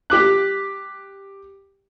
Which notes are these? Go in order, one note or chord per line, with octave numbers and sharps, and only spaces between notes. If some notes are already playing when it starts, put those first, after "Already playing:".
G4 D6 F#6